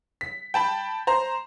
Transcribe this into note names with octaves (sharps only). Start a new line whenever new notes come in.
B6
G5 A5 B5
C5 A#5